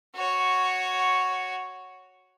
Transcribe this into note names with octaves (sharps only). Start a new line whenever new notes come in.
F#4 C#5